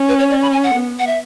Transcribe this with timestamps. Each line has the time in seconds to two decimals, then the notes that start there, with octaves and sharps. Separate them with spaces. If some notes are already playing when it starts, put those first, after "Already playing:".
Already playing: C#4
0.09 B4
0.19 C#5
0.31 D5
0.42 B5
0.52 G#5
0.63 F#5
0.74 B3
0.99 F#5
1.07 E5